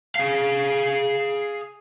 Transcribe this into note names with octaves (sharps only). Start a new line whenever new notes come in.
G#4 F5